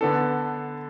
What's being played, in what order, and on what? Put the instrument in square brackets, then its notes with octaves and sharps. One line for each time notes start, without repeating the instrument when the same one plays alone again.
[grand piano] D3 B3 D4 A4